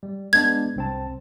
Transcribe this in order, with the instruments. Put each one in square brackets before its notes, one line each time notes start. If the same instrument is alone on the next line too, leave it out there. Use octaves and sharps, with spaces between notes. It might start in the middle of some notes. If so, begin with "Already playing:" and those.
[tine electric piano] G3
[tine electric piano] G#3 B3 D4 [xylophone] G#6
[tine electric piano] C2 C4 A5